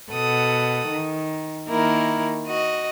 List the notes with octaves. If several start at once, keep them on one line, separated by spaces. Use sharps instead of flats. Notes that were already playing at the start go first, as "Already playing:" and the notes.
B2 A4 F#5 D#6
D#3
D#3 A#3 E4 A#4
F#4 D#5